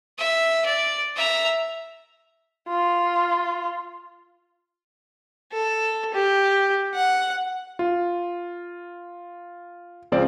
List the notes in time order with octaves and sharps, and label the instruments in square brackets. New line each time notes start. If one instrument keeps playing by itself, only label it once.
[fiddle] E5
D5
E5 A#5
[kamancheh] F4
[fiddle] A4
G4
F#5
[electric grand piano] F4
C#2 F3 C4 F4 G#4 D5